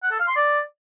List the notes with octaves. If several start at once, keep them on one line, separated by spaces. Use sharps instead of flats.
F#5
A4
F5
C6
D5